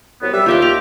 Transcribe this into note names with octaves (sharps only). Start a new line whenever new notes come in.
C2 F#3 B3
G3 G4 E5
D#2 F4 G4 E5 G5
A#5